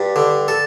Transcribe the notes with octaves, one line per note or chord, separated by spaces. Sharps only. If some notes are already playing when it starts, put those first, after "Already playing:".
Already playing: G2 G3
D3
A4